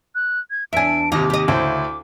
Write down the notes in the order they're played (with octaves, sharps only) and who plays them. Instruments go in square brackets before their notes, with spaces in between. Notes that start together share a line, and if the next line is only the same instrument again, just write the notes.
[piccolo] F#6
G#6
[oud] E2 D4 [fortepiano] E5 G#5 [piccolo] D7
[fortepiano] D#2 C3 [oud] D#4 [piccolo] D6
[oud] G4 D#5
[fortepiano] D2 E4 C5 [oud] C#3